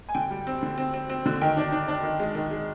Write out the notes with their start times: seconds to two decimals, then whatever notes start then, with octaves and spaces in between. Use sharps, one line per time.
0.09 G#5
0.15 D3 G5
0.31 G3
0.47 C4
0.63 D3
0.77 C4
0.93 C4
1.09 C4
1.26 D3
1.41 D#3 G5
1.57 D4
1.72 D4
1.88 D4
2.03 D#3
2.20 G#3
2.35 D#3
2.51 G#3